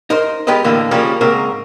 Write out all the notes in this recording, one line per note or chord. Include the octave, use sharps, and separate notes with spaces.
D#4 A#4 C5
G#3 B3 G4 A#4 B4 D#5
A2 D3 E3 A#3
C#3 F3 G3 A#3 C#4 A#4
G#2 C#3 A#3 C4 A#4